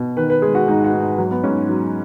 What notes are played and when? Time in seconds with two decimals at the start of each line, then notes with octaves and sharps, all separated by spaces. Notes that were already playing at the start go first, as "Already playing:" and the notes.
Already playing: B2
0.17 D#3 B4
0.30 B4
0.42 G#3 G#4
0.55 F#4
0.68 G#2 D#4
0.84 F#4
0.93 G#2
1.01 D#4
1.18 F#3
1.31 B3
1.44 G#2 C#4
1.69 F#3